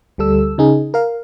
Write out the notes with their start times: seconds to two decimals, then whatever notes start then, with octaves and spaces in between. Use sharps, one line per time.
0.18 D2 G3 A4 E6
0.58 C#3 D#4 G#4
0.94 A#4 F5